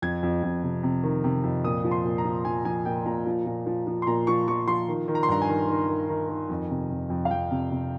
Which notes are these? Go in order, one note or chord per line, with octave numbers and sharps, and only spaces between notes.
F2 G#6
F2
F2
C3
C3
D#3
C3
F2
A#2 D#6
F3
C6
A#2
A#5
F3
F3 G#5
F3 G#5
A#2 G5
A#2 A#5
F3
A#2
F3
F3
C6
A#2 A#5
F3 C#6
F3 C#6
F3 C6
D#3
D#3
A#5
C6
G2 A#5
G#5
D#3
D#3
D#3
D#3
D#3
F2
C3
F2
F2
F5
F2 G5
C3
C3